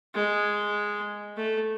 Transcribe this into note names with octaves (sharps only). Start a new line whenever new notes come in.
G#3
A3